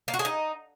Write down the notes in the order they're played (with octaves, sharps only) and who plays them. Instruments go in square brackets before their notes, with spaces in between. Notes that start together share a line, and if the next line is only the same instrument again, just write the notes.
[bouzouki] A#3
F#4
G#4
D#4